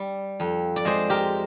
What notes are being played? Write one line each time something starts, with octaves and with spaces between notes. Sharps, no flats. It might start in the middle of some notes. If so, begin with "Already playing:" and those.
Already playing: G3
F2
D5
G#3 G#4 C5
G4 A#4